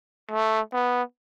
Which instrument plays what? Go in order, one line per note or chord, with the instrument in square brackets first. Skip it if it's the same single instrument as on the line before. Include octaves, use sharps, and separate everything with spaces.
[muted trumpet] A3
B3